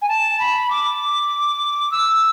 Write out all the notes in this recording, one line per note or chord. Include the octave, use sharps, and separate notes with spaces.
G#5
A5
B5
D6
E6